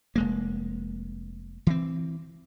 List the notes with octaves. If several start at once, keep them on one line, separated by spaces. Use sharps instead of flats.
F1 G#3 A#3
E3 C4